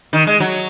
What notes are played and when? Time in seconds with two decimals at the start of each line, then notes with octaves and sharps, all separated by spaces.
0.13 D#3
0.27 G#3
0.40 F#3